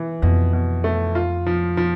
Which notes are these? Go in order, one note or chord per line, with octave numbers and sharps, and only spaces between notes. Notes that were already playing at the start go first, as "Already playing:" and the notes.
Already playing: E3
F2 B2
B2
A3
F4
F3
F3